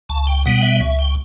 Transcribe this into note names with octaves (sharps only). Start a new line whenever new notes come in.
C#2 A5
G5
B2 G3 B3 F#5
E5
C#2 E5
G5